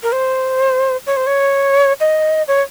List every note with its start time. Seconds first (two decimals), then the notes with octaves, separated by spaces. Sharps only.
0.03 A#4
0.12 C5
1.07 C#5
1.17 C5
1.27 C#5
2.00 D#5
2.48 C#5